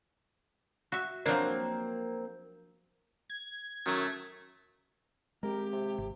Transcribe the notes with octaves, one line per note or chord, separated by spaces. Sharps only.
F#4 E5
F3 F#3 A#3 C4 D4
G#6
F#2 D#3 F#3 A3
G#3 C4 G4 A#4
C3
G#1